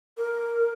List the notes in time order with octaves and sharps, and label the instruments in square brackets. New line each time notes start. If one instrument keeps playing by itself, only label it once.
[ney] A#4